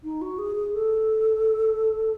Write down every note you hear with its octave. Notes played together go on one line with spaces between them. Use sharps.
D#4
F#4
G#4
G#4
A4